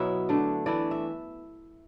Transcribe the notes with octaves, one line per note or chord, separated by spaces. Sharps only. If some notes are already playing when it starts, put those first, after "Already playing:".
Already playing: B2 F#3 B3 E4 E5 F#5
D3 A3 D4
E3 A3 E4 D5
E5